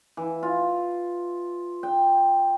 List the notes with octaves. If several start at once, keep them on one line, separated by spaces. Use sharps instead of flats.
E3
F4
G5